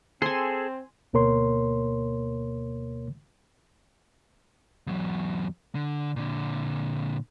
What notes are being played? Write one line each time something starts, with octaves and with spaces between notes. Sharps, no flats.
C4 G#4 A4 G#5 C6
D2 B2 A#3 A#4 C#5 C6
E2 F#3
D3
A#2 D3